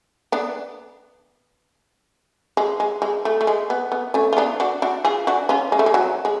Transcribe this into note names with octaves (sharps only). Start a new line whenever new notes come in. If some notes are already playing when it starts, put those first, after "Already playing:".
B3 D4
G#3
G#3
G#3
A3
A3
G#3
B3
B3
A3 C#4
F4
B3 D4
D4 F#4
D4 F#4
F4 G#4
D4 F#4
C#4 F4
G#3
A3
G#3
F#3
G#3